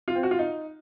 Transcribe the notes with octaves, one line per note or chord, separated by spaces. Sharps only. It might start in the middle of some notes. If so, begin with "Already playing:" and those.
F4
C4
F#4
F4
D#4